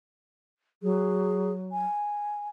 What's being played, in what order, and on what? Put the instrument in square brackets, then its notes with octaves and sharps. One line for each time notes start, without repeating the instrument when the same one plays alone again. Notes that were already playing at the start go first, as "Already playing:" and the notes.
[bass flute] F#3 [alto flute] G#4
[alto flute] G#5